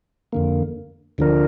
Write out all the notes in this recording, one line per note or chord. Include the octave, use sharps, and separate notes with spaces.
F2 D3 A#3
D2 D3 F3 D4 A#4